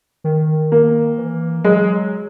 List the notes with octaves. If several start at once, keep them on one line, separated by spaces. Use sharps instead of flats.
D#3
A#3
E3
F#3 G#3